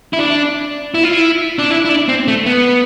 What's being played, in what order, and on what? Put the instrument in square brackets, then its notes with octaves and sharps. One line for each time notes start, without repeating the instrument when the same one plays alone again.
[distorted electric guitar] E4
D4
E4
F4
E4
D4
E4
E4
D4
C4
A3
B3